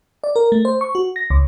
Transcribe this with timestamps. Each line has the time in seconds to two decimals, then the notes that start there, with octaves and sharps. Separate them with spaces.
0.24 D5
0.36 A#4
0.52 A3
0.65 C5
0.81 C#6
0.95 F#4
1.16 A#6
1.30 C#2